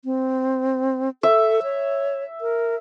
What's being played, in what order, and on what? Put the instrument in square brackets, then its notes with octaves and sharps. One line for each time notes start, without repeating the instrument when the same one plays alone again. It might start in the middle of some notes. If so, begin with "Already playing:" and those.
[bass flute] C4
[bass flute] A4 [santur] E5
[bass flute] C#5
A#4